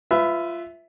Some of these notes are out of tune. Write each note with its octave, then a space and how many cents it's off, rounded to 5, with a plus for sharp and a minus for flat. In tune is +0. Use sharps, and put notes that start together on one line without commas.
F4 -15 B4 +20 E5 +0